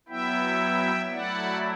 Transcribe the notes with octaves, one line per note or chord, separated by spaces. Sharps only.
F#3 B3 E4 E5 G5
F#3 A3 E4 D5 F#5